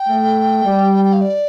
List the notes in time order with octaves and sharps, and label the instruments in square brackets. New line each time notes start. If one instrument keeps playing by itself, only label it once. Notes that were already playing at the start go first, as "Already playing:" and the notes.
Already playing: [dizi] G5
[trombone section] A3
G3
[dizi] G5
F5
D5